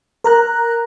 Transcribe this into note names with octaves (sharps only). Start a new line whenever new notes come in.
A#4 A#5 F#6